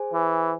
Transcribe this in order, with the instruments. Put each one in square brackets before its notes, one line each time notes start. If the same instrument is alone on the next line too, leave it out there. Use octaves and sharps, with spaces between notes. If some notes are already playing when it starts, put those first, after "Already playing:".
Already playing: [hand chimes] G#4 C5 G#5
[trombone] E3